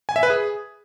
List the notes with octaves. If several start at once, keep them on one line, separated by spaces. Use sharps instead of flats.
G#5
E5
B4
G#4